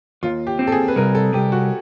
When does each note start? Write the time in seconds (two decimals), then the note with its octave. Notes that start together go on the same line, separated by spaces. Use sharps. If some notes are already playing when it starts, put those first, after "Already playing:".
0.23 D#2 F4
0.47 G4
0.59 C4
0.67 A4
0.72 G#4
0.88 B4
0.96 C2 A#4
1.15 A4
1.33 C2 G4
1.52 F#4